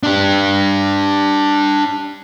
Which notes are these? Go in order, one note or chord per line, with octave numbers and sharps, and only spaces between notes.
D4 G4